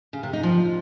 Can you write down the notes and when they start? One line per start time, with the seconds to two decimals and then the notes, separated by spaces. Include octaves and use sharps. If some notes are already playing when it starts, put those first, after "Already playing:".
0.13 C#3
0.23 C3
0.33 D#4
0.43 F3